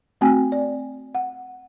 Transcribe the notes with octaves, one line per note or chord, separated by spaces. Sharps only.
A3 C4 F#4 G5 G#5
D5
F#5